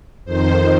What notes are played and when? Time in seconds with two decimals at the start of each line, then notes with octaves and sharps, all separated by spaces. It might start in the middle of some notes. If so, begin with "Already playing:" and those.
0.25 F2 D#3 C5